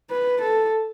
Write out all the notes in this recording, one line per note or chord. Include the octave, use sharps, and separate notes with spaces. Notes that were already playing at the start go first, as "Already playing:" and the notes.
B4
A4